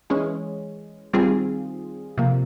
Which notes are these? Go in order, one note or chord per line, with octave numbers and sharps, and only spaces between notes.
E3 G#3 C#4
D#3 G3 C4 F4 G#4
C3 F3 A#3